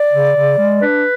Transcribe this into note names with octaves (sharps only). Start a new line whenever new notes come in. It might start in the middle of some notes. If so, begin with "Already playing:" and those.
Already playing: D5
C#3
C#3
G#3
D4 B4